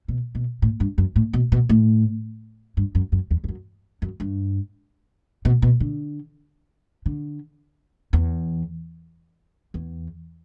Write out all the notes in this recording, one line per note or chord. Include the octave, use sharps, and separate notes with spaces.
B2
B2
A2
G2
F#2
A2
B2
B2
A2
G2
F#2
F#2
E2
E2
F#2
F#2
G2
B2
B2
D3
D3
E2
E2